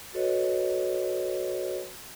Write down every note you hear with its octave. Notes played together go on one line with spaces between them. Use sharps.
F#4 A4 B4 C#5 D#5